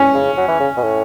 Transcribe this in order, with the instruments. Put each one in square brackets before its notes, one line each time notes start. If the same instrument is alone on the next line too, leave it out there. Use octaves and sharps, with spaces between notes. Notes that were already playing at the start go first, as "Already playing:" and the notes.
Already playing: [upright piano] C#4
[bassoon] C#3
F#3
E3
C#3
B2
A2